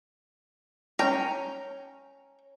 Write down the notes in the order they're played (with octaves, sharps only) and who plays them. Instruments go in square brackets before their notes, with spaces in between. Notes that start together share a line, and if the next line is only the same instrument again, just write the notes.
[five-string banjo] C#4 G5 A#5